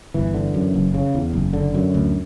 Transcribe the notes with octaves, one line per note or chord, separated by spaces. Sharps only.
G1 E3
D3
F#2
F#1
C#3
E2
F#1
D3
F#2
D2